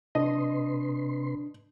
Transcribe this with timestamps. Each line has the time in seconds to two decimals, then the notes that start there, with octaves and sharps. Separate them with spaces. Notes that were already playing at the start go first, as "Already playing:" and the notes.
0.15 C3 D4 B4 D#5 C6